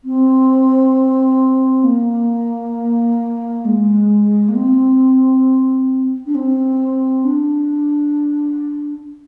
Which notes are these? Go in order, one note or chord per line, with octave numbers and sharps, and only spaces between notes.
C4
A#3
G#3
A#3
C4
D4
C4
D4